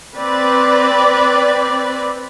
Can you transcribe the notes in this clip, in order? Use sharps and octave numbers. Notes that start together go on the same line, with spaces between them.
C4 B4 D5